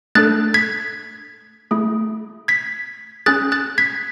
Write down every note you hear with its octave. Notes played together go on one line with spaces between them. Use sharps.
A3 D4 A4 F#6 A6
G#6 B6
A3 E4 G#4
G#6 B6
C#4 G#4 F#6 A6
F#6 A6
G#6 B6